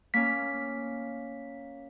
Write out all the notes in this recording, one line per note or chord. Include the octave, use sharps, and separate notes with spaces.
A#3 C#4 B6